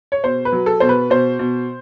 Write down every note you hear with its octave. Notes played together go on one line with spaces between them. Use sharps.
C#5
B2 C5
B4
F#3
A4
B2 C5
B4
B2 C5
B2